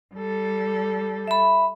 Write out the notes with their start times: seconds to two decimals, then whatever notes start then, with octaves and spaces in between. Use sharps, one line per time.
0.15 G3 A4
1.27 E5 B5